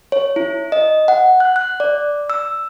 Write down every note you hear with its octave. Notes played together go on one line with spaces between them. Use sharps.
C#5
E4
D#5
F#5
F#6
F#6
D5
E6